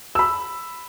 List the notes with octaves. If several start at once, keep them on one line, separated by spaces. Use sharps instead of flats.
B5 E6